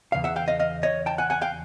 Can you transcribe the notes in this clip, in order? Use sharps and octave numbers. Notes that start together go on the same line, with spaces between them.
E2 C#3 F5
E5 F#5
F5 G5
D#5 F5
D#5 F5
C#5 D#5
G5 A5
F#5 G#5
F#5 G#5
F5 G5